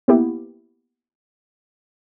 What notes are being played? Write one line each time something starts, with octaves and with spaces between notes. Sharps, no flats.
A#3 B3 E4 G4